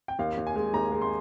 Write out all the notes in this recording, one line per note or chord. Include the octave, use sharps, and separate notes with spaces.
G5
D#2 F5
D#2
G#5
G#3
D#2 A#5
G#3
C6